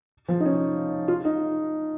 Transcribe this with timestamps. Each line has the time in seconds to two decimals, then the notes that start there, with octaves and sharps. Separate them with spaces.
0.28 F3
0.40 D#4
0.45 C#4
1.08 F4
1.25 D#4